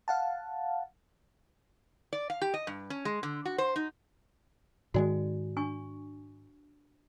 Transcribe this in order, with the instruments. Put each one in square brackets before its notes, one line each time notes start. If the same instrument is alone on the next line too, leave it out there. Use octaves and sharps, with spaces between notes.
[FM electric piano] F5 F#5 A5
[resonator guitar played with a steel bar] D5
F5
G4
D#5
G2
C#4
G#3
D3
F#4
C5
D#4
[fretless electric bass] G#2 D#3 G#3 [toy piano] F#4 D5 G#5
[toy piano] D4 G#5 C#6